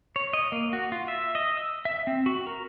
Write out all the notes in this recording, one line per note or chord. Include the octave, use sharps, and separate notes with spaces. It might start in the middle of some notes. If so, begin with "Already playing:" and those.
C#5
D#5
A#3
F#4
F4
E5
D#5
E6
E5
C4
F#4
A#4